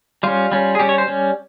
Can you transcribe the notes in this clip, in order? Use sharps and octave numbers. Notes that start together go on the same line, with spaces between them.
G3 C#4 F4
G3 C#4
G#4
G3 C#4 G4
C#5
C5
G3 C#4